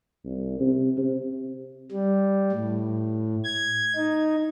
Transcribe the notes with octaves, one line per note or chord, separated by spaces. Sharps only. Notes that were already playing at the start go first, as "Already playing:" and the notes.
C2
C3
C3
G3
A2
G#6
D#4